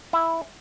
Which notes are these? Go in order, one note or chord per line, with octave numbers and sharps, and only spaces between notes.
E4